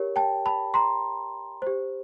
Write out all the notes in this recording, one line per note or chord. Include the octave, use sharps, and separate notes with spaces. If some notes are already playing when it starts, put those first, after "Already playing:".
Already playing: G4 A#4 C#5
G5 A5
A5 B5
A#5 C6
G4 C5